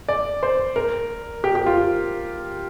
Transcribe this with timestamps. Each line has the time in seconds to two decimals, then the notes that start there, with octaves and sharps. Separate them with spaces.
0.09 D5
0.43 C5
0.76 A#4
1.44 G4
1.55 G4
1.66 F4